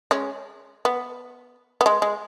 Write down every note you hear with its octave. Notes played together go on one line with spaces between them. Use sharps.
G#3 C#4
B3
B3
G#3
G#3